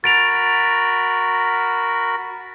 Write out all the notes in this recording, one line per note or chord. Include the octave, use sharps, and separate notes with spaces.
F#4 A#4 B5 A6 D7 F7